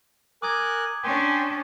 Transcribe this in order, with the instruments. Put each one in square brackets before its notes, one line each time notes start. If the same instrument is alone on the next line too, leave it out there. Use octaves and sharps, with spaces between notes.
[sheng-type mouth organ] A#4 G#5 F#6 [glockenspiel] D6 D#6 G#6
[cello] C#4 D4 [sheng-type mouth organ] G5 G#5 C6